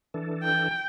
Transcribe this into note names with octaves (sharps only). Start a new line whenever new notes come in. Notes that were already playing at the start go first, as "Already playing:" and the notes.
E3 D4 A4
G5